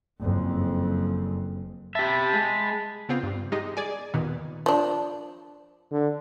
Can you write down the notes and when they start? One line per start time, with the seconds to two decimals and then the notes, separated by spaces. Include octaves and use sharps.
0.20 F#1 F2
1.95 G4 E5 A5 B5
2.33 G#3
3.09 C#3 B3 C4 F4
3.23 G2 G3
3.52 G3 G#3 D#4 D#5
3.77 G#4 D5 G#5
4.14 D#2 A#2 D#3 B3
4.66 F3 D4
5.91 D3